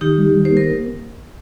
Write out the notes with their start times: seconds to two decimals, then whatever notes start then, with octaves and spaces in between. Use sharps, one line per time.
0.01 D#3 D#4 G4
0.18 G3
0.34 D#3
0.45 C5
0.51 A#3
0.57 A#4